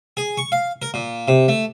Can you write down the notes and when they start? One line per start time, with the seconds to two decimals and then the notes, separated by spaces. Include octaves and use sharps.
0.17 G#4
0.38 C#6
0.52 F5
0.82 A#4
0.94 A#2
1.28 C3
1.48 A3